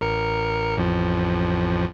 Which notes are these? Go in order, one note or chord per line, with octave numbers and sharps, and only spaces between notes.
A1 A#4 C#7
A1 F2 F3